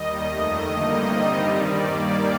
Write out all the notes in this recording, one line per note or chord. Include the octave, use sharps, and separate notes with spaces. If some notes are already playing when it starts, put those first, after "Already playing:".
Already playing: D#2 D#3 G3 D#5
F2 D#3 A3 D#5
G2 D3 G3 A#3 D#4
C3 D#3 G3 C4 D#4 D#5
G2 D#3 G3 D5
D#2 D#3 G3 A#3 D5